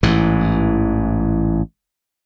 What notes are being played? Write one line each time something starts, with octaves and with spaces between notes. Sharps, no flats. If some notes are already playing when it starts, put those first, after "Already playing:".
A1 G#2 E3